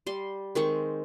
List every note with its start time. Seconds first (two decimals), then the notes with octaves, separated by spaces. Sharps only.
0.06 G3 C6
0.55 D#3 G#3 C4 C#6